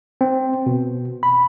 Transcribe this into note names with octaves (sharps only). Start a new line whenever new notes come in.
C4
B2
B5